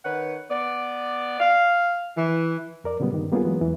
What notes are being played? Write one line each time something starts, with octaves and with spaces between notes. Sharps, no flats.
D#3 B4 C#5 F#5
B3 D5
F5
E3
F2 A#4 D5
A#2 C#3 F#3 G3 B3
G2 D#3
G3 A#3 B3 C#4 F4 G#4
E3 F#3 G#3 B3
E2 E3